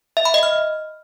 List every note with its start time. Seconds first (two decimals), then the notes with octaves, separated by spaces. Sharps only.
0.17 E5
0.25 B5
0.34 D#5
0.43 F6